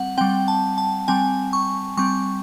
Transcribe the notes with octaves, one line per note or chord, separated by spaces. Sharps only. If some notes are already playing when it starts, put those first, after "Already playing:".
Already playing: G3 C4 F#5
G3 C4 G5
A5
A5
G3 C4 G#5
C#6
G3 C4 C#6